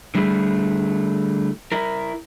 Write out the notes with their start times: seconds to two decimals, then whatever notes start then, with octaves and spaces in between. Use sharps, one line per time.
0.15 D3 G3 A3 E4 G#4
1.72 E4 A#4